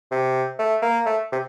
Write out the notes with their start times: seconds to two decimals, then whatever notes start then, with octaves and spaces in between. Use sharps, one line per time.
0.11 C3
0.59 A3
0.82 A#3
1.06 A3
1.32 C3